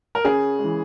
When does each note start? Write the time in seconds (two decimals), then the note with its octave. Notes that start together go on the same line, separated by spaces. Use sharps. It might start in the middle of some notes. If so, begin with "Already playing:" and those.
0.15 A#4
0.25 C#3 G#4
0.58 G#3
0.64 E3